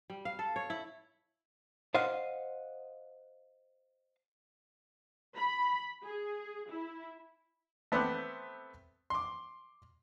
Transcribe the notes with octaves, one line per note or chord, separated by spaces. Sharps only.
G3
F5
A4
C#5
E4
C5 D#5 F5 F#5
B5
G#4
E4
A3 B3 C4 C5 D6 F#6
C6 D6